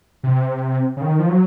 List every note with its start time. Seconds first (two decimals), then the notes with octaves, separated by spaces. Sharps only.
0.23 C3
0.97 C#3
1.02 D#3
1.19 F3
1.29 F#3